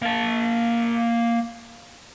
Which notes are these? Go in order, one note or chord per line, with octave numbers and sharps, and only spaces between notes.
A#3 A5